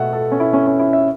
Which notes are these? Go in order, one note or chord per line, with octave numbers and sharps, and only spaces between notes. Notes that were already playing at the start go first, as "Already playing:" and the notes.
Already playing: B2 A3 E5 F#5
A4
C#4
E4
C#4
C#4
E4
E5